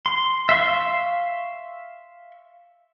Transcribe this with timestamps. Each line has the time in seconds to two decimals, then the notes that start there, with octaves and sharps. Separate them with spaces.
0.06 C6
0.49 E5 F5 C6 C#6